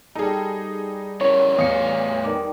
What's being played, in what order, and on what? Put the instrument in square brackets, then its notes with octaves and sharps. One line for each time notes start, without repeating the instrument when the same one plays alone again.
[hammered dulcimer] G3 A4 [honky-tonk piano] D#4 G#4
[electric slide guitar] C#4 E4 A#4 [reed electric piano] C#5
[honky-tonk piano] E2 C#7 [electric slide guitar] A2 F5 [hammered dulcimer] D#5
[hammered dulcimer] D#3 D5